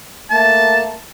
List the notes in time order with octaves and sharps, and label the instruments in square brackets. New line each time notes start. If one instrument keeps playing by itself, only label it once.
[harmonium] A3 A#3 [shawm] A5